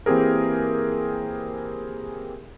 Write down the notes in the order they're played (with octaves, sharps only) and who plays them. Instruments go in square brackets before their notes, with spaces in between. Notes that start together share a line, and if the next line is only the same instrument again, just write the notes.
[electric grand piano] E3 A#3 C4 G4 G#4 A#4